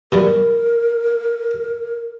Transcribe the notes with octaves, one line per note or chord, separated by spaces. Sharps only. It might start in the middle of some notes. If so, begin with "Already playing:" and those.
B2 E3 G3 A#4